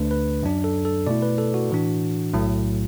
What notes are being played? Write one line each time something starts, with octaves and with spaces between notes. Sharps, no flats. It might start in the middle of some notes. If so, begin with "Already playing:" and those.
Already playing: D2 D3 A3 D4 B4
B4
F#2 F#3 D4
A4
A4
B2 A3 E4 D5
B4
A4
F#4
A2 E3 D4
B1 A2 F#3 A3